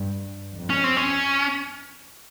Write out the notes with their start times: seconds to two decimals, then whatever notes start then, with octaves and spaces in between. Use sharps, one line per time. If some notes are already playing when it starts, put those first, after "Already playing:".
Already playing: G2
0.56 F2
0.70 C#4
0.84 C4
0.97 C#4